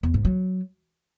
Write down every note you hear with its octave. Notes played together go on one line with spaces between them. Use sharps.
E2
G#2
F#3